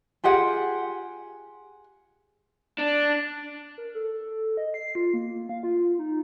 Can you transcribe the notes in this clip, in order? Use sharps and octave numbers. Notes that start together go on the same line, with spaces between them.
F4 G4 G#4 F#5
D4
A#4
A4
D#5
C7
F4
A#3
F5
F4
F4
D#4